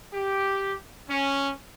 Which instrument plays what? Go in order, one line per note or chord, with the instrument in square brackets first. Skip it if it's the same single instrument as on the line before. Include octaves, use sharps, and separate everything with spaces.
[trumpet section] G4
C#4